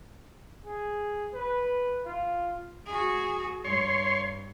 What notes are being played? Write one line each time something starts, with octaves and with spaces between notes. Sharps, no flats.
G#4
B4
F4
F#4 G#4
G2 C#5 C6